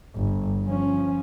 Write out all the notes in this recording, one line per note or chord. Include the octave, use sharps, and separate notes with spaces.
G1
F3 C#4